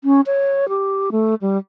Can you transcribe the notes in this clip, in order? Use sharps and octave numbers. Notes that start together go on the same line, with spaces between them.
C#4
C#5
G4
A3
G3